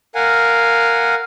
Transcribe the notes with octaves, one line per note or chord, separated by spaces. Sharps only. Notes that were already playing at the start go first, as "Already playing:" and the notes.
A#4 F5 F#5 G#5